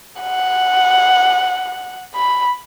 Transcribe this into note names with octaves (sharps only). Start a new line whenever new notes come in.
F#5
B5